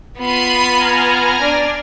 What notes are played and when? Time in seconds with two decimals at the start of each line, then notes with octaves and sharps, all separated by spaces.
0.18 B3 F4 B5 C7 D#7
0.77 G#5 A#5 F6
1.42 D4 D5